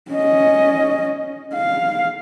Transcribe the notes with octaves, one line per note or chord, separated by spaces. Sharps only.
C#4 D#5
F5